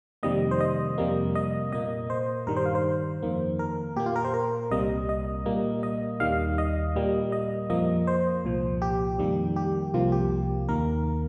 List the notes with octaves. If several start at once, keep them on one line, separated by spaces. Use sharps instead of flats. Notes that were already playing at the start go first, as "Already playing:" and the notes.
F2 C3 D#3 G3 A#3 D#5
C5
D#5
F2 C3 G3 A#3
D#5
A#2 A#3 D#5
C5
G2 D#3 G3 A#4
C5
F5
C5
F2 D#3 A#3
A#4
A#2 A#3 G4
F4
A#4
C5
A#4
C2 C3 G3 A#3 D#5
D#5
A#2 G3 A#3
D#5
D#2 D#3 G3 F5
D#5
A#2 G3 A#3
D#5
F2 F3 A#3 D#5
C5
C2 A#2 F3
G4
F2 D#3 G3 A#3
G4
C2 C3 F3 A#3 F4
G4
D#2 D#3 A#3 A#4